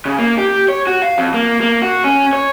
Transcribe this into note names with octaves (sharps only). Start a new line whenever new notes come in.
C#3
A#3
G4
C#5
F#4
F5
F2
A#3
A#3
F#4
C#4
C#5